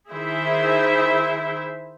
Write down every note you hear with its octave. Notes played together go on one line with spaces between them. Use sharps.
D#3 E4 G#4 C5 E5